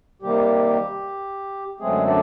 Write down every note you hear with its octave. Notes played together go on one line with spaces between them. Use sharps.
C3 D#3 G3 A#3 G4
F#2 D3 F#3 G#3 A3 C4 G#4
D4 D5